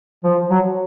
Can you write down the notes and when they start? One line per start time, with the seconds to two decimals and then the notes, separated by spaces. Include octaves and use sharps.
0.24 F3
0.50 F#3